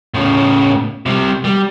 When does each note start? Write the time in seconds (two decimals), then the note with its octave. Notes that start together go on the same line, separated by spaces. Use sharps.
0.14 A2 C#3
1.06 C3 G3
1.45 G3